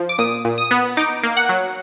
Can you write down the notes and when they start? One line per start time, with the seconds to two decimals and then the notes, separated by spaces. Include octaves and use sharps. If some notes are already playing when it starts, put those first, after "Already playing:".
Already playing: F3
0.09 D6
0.18 A#2 D#6
0.45 A#2
0.58 D#6
0.71 B3
0.97 D#4 D6
1.23 A#3
1.37 F#5
1.49 F#3